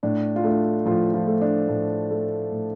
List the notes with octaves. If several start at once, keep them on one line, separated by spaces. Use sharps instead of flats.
A2 D4
F4
A3 D4
A2 F3 F4
F3 F4
A3
D4
A2
A3
A2